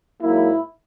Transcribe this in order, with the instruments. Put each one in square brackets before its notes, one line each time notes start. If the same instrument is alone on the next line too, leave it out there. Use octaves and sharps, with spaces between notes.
[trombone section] G#2 F#3 A#3 E4